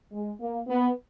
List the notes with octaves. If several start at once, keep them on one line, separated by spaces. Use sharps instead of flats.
G#3
A#3
B3